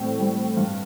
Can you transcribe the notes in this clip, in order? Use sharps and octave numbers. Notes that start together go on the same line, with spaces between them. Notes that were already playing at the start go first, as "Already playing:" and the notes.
Already playing: A2 G3 C4
G3
G2